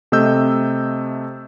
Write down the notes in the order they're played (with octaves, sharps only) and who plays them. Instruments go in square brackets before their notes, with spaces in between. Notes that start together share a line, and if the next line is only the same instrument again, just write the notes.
[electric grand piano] C3 A3 D#5 E6 G6